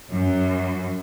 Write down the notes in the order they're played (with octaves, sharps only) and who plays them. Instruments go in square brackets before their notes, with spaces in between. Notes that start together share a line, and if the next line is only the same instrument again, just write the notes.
[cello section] F#2